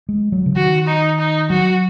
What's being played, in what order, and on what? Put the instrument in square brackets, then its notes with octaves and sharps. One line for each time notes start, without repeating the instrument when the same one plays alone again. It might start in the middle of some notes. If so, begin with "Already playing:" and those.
[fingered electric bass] G#3
F#3
C#3
[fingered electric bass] D#3 [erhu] F#4
[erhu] D#4
D#4
[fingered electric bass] F#3 [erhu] F#4